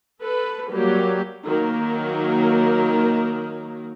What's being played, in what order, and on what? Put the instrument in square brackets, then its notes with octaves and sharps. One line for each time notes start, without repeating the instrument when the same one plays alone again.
[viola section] A4 B4
F#3 G3 A#3 G4
D#3 F#3 A#3 A#4